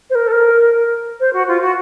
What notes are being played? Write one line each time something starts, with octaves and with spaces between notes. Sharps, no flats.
C5
A#4
A4
A#4
C5
F#4
F4
F#4